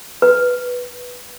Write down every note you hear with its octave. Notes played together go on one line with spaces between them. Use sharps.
B4